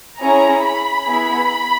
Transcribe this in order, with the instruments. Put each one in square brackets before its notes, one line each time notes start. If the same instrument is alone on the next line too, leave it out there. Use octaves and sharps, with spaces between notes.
[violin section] C#4 E4 G#4 A#5
B5
B3 E4 G#4